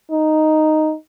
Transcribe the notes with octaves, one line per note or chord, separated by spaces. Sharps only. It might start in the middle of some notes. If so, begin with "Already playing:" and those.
D#4